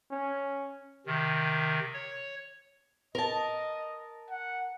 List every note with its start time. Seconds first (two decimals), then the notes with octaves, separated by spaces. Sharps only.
0.11 C#4
1.06 C3 D#3
1.93 C#5
3.15 A#4 D#5 A5
4.30 F#5